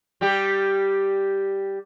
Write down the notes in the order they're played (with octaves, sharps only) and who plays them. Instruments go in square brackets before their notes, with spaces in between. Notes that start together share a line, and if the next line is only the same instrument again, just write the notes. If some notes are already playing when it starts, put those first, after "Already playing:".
[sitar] G3 G4